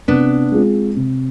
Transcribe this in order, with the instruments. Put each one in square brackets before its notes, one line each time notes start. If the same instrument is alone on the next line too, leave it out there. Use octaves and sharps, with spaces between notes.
[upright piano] C3 [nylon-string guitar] B3 D4
[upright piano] G#3 C4 F4 G#4
C3